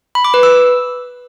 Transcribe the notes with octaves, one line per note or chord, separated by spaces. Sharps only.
B5
D6
B4
E6